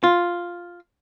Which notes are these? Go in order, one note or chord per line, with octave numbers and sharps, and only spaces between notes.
F4